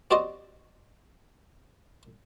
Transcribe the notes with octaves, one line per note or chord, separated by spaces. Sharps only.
C4 F#4 G4 C5 D5 D#5